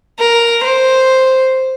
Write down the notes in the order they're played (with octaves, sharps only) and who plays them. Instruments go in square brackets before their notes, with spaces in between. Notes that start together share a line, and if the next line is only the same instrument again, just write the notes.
[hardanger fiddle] A#4
C5